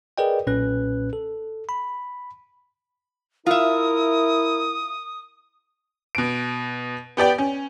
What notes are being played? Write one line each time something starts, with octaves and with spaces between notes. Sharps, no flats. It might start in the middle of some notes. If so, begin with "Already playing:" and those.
G#4 A#4 B4 D5 D#5 G5
B1 A#2 C#4 B4 F#6
A4
B5
E4 F4 A#4 E5 D#6
B2 D7
B3 G4 D5 G5
C#4